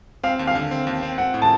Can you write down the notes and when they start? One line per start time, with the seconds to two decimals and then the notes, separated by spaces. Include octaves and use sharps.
0.23 C4 F5
0.39 D#2
0.47 F5
0.55 D3
0.71 C4
0.87 D#2
1.03 C4
1.18 C4 F#5
1.34 A2
1.42 A5